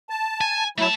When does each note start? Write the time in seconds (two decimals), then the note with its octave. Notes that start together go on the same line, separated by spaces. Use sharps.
0.10 A5
0.41 G#5
0.78 F#3 A3 E4 A5